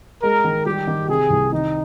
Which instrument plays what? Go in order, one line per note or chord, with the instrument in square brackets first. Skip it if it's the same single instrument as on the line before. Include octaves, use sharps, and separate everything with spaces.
[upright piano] G#3 [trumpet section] A#4
[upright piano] D#3
[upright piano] G3 [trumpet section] G4
[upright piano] D#3
[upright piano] C3 [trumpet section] G#4
[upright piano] C2
[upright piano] D#3 [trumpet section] D#4